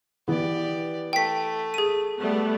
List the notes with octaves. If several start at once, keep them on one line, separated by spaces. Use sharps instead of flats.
E3 B3 G4 D5
A3 G5 B6
G#4 D#7
G3 A3 B3